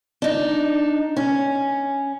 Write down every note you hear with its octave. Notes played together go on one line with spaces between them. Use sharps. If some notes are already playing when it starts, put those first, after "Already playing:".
D4 D#4
C#4